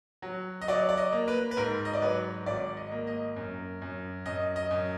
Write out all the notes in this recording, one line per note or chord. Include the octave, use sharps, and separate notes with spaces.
F#3
D#5
F#3 D5
D5
D#5
A#3
B4
B4
G#2 A#4
D#5
D5
F#3 B4
G#1 D5
D#5
A#3
D#5
F#2
F#2
F#2 D#5
D#5
F#2